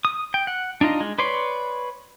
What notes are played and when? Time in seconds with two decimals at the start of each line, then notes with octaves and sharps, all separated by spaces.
0.05 D#6
0.34 G5
0.47 F#5
0.81 D4 D#4 F4 D#5
1.01 G#3
1.19 B4 C#5 D5 C6